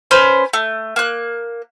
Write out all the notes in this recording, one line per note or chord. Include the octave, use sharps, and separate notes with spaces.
C#4 B4 C5
A3
A#3 F#6